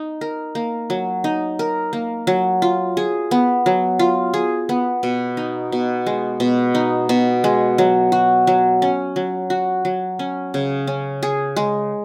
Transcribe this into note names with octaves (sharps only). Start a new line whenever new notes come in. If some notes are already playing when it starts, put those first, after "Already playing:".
Already playing: D#4
A#4
A#3
F#3
D#4
A#4
A#3
F#3
F4
G#4
B3
F#3
F4
G#4
B3
B2
D#4
B2
G#3
B2
D#4
B2
G#3
F#3
F#4
F#3
C#4
F#3
F#4
F#3
C#4
C#3
C#4
G#4
G#3